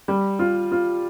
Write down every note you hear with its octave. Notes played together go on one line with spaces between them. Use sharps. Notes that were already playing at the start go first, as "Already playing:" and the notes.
G3
F4
F4